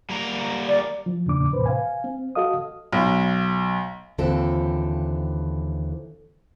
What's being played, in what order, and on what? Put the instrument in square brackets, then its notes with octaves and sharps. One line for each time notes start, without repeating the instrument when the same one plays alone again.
[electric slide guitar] G3 A#3 A#5
[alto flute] D5
[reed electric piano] F3
E2 A#2 C#3 D4 D6
D#2 A2 C3 E3 B4 C5
F5 G#5
C4
F#4 A4 D#5 F5 D#6
[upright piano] B1
[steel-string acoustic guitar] D#2 D3 E3 C4 F4 A4